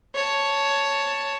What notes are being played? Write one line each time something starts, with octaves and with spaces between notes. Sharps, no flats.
C#5 A5